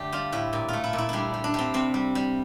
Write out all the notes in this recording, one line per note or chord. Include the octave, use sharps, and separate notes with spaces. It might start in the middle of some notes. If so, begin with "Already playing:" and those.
Already playing: D3 A3 D4 G4
G3 F4
A2 E4
A#2
A3 F4
E4
A#2
E4
G3 D4 E4
G3
D4
G3 C4
C3 C4
G3
G3